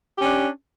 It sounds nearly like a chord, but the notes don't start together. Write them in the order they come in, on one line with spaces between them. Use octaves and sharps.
G4 C#4 D4